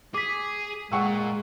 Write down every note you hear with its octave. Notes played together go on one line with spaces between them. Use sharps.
G#4 D6 B6
A#2 G#3 F#5 C#6 E6